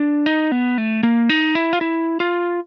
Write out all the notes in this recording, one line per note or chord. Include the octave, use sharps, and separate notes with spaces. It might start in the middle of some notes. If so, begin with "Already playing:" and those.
Already playing: D4
D#4
B3
A3
A#3
D#4
E4
F4
E4
F4